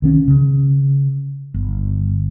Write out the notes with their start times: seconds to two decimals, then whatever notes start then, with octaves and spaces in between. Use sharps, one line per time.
0.02 C2 D#3 C#4
0.28 C#3
1.54 G1